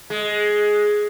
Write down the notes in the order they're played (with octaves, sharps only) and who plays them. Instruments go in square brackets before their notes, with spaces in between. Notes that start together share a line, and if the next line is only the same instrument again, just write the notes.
[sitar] G#3